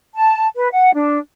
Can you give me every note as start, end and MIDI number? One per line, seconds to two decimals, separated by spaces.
0.15 0.46 81
0.56 0.67 71
0.72 0.92 78
0.93 1.18 62